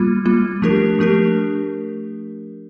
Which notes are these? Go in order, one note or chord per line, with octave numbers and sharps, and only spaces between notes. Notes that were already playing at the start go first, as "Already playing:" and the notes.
Already playing: G3 A#3 F4
G3 A#3 F4
F3 A3 D4 G4 A#4
F3 A3 D4 G4 A#4